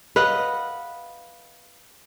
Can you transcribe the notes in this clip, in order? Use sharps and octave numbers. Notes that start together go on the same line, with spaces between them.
B4 D#5 F5 F#5